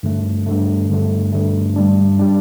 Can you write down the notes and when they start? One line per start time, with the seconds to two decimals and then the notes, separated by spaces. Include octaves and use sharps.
0.03 G2 D3 A3
0.46 G2 D3 A3
0.90 G2 D3 A3
1.33 G2 D3 A3
1.76 G2 G3 D4
2.19 G3 D4